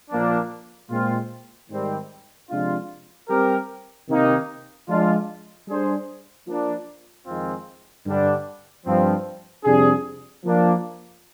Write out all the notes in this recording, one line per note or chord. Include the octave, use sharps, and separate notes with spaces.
A#2 F3 A#3 D4
A#2 G#3 C4 F4
G#2 D#3 G3 C4
C3 F3 G#3 D4 F4
G3 C4 G4 A#4
C3 D#3 A#3 D#4
F3 G#3 D4 F4
G3 D4 G#4 C5
F3 A#3 D4
F2 D#3 G#3 C4 F4
G2 D3 G3 D4
G2 F3 C4
F2 C3 G3 D4 G#4
F3 A#3 D4